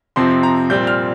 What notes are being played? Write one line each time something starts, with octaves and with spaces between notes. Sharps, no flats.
F2 C3 F3 C4 C6
A#5
A#2 G3 C4 G6
F6